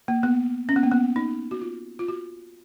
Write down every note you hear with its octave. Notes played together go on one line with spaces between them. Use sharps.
A#3
B3
C#4
B3
A#3
B3
D#4
F#4
F4
F4
F#4